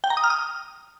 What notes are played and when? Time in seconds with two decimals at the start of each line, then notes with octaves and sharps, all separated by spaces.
0.04 G5
0.10 A#5
0.17 D#6
0.24 F6
0.30 D#6